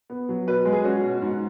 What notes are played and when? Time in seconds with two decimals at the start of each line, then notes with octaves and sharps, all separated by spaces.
0.10 B3
0.29 F#3
0.47 B2 B4
0.65 G#3
0.73 G#4
0.84 C#4 F#4
1.04 B2
1.22 G#2